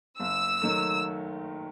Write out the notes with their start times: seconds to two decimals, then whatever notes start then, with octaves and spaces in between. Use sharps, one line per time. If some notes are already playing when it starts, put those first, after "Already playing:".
0.19 F#1 E6
0.62 D#3 F#3 A3